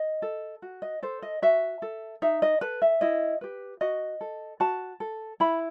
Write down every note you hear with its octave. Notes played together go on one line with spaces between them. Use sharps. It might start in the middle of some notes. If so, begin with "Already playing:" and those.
Already playing: D#5
A4
F#4
D#5
A4 C5
D#5
F#4 E5
A4
D#4 E5
D#5
A4 B4
E5
E4 D#5
G4 B4
F#4 D#5
A4
F#4 A5
A4
E4 B5